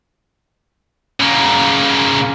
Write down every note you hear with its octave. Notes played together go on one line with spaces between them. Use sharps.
C#3 A#3